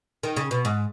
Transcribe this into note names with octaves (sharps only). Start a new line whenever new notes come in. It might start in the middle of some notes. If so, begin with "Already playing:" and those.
D#3
C#3
B2
G#2